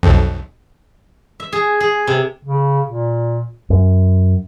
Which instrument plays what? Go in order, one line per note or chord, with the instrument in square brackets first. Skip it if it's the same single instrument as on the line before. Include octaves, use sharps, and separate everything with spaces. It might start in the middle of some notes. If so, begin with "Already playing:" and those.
[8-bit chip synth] B1 F2
[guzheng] E5
G#4
G#4
C3
[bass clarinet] C#3
A#2
[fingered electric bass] F#2